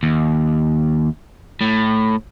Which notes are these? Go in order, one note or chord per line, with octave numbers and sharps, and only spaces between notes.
D#2
A2